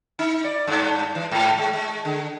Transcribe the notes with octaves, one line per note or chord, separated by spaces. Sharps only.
D#4
D5
G2
E3
G#2
G#3
G#3
D3